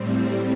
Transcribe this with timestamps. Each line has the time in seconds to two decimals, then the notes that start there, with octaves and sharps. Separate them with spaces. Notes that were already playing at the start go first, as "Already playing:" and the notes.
Already playing: A2 G3 C4